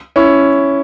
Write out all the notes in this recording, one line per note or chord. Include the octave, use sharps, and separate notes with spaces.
C#4 E4